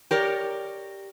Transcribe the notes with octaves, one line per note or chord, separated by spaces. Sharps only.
G4 A#4 C#5 D5